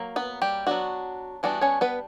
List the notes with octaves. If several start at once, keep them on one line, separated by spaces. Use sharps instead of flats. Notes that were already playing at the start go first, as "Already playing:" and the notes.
Already playing: F#3 A#3
B3 B4
G3 G4
F#3 B3 D4 F#4
E3 G3 B3 D4 F#4
C#4 C#5
B3 B4